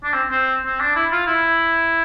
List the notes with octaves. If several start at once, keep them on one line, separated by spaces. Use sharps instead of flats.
D4
C4
C4
C4
D4
E4
F4
E4